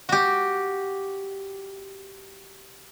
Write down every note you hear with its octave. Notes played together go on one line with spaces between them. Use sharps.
F#4 G4